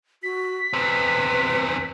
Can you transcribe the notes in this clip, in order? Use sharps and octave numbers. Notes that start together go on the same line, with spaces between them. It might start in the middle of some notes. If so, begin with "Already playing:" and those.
F#4 B6
E2 C4 B4